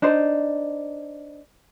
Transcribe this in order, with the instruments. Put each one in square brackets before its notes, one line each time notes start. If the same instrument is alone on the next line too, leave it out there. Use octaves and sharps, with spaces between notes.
[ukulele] D4 D#4 C5